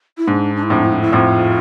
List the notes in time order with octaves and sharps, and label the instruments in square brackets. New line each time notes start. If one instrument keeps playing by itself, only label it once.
[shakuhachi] E4
[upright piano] G#2 [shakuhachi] D4
[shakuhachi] D4
E4
[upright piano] F2 A2 [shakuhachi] D4
[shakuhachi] E4
D4
E4
[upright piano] F2 A2 [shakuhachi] F4